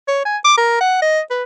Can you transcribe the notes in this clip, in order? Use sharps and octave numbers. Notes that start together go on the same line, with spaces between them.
C#5
G#5
D6
A#4
F#5
D#5
B4